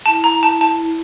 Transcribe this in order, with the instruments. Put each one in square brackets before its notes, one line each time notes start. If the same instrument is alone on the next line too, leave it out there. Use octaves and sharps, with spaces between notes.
[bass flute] E4 [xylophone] A5
[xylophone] A#5
A5
A5